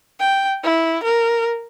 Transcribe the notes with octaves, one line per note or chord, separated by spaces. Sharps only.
G5
E4
A#4